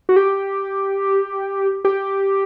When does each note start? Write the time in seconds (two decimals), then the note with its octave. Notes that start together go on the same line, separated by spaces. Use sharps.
0.09 F#4
0.16 G4
1.85 G4